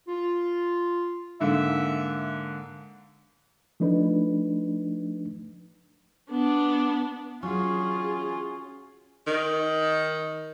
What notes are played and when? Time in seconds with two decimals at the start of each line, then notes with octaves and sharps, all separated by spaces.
0.08 F4
1.41 G#2 D3 A#3 E5
3.80 F3 A3 D4 D#4 B4
6.31 B3 D4
7.43 F#3 C#4 F4 G#4
9.27 D#3